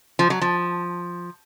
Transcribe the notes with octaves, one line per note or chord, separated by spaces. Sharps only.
F3
F#3
F3